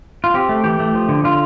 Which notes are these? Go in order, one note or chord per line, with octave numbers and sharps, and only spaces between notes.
F4
C4 G4
A3
E3 G4
A3
F3
D3
D3 F4